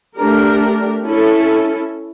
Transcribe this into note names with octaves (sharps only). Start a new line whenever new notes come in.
A3 D4 G4 A#4
C#4 E4 A4